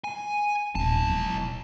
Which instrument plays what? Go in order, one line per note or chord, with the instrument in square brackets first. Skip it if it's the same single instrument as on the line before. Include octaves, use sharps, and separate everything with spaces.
[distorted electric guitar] G#5
[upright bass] D#1 [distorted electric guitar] B1 A5
[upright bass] G#3 E4